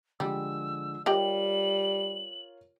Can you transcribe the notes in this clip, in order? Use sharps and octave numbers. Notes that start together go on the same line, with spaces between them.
D3 F3 G3 G#3 E6
G3 F4 G4 A#4 C#5 D#5 G5 F#7